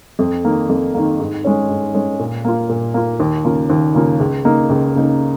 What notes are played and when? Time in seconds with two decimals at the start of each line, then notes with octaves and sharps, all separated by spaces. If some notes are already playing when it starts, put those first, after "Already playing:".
0.19 F2
0.44 D#3 A#3
0.69 F2
0.94 D#3 A#3
1.20 G#2
1.44 G#3 C#4
1.69 G#2
1.94 G#3 C#4
2.19 A#2
2.45 A#3 F4
2.69 A#2
2.94 A#3 F4
3.20 D#2
3.45 C#3 A#3 F4
3.70 D#2
3.95 C#3 A#3 F4
4.20 C#2
4.45 C#3 A#3 D#4
4.70 C#2
4.95 C#3 A#3 D#4